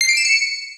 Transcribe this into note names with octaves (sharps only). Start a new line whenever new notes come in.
C7
D7
E7
C#7